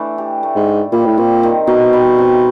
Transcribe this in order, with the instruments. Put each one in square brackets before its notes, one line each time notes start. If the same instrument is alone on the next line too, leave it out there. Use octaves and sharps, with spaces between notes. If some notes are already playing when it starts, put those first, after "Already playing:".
Already playing: [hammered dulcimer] E3 A3 D4
G4
A3
[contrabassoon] G#2
[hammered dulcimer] D4
[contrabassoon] A#2 [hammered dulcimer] G3
[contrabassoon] A2
[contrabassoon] A#2 [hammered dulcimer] C4
[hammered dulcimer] D#3
[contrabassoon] B2 [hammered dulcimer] D#4
[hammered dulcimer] G3
C4